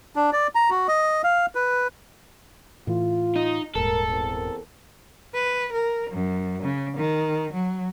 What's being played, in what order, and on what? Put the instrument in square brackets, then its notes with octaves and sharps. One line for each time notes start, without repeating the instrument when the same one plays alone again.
[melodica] D4
D5
A#5
F#4
D#5
F5
B4
[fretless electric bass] A2 E3 [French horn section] F4
[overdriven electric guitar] D#4
[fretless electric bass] D#1 G#2 [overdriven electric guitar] A4 [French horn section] A#4
[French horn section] E2 C4 A#4
[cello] B4
A#4
F#2
C#3
D#3
F#3